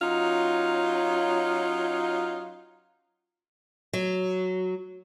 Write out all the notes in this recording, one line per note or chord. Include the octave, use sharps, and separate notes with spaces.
F#3 C#4 D#4 F4
F#3